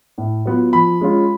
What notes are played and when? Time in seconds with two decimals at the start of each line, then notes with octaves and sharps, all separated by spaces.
0.18 A2
0.46 F#3 B3 F4
0.73 F3 B5
1.01 G#3 C#4 F4